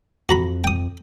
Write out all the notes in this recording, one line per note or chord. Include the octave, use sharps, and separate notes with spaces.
F2 F#4 A#5 B5
G5 D#6